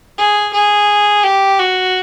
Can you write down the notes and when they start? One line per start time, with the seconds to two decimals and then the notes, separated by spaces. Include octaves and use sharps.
0.18 G#4
0.53 G#4
1.23 G4
1.59 F#4